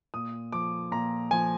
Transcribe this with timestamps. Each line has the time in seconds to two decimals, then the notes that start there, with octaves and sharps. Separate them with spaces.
0.14 A#2 D#6
0.52 F3 D6
0.92 A#2 A#5
1.31 F3 G#5